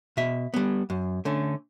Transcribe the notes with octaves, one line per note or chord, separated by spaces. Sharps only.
B2 E5
G3 B3
F#2
D3 A3 C#4